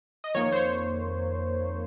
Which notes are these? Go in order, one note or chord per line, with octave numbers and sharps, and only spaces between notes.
D#5
F2 D#3 A#3 C#5
C5
C#5